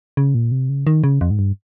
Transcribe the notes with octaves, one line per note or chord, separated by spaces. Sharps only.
C#3
A#2
C3
C#3
D#3
C#3
F2
G#2
G2